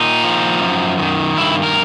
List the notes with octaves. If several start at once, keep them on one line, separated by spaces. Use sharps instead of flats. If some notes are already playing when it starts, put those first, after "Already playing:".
Already playing: A#2 D#4
F3
F#2
D#3
G2 E4
A#4